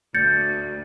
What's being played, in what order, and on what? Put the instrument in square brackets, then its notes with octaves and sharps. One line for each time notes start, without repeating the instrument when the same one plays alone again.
[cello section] D2 [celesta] G6 A6 C#7